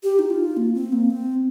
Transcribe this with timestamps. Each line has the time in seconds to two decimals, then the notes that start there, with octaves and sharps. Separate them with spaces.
0.03 G4
0.19 D#4
0.30 F4
0.57 A#3
0.75 C4
0.92 A#3
1.10 C4